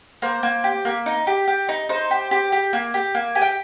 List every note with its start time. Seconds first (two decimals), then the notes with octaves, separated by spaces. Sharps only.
0.22 A#3 C5
0.43 A#3
0.64 G4
0.85 A#3
1.06 D#4
1.27 G4
1.48 G4
1.69 D#4
1.89 D#4 C5
2.11 G4
2.31 G4
2.52 G4
2.73 A#3
2.94 G4
3.15 A#3
3.35 G4 G#5
3.42 G5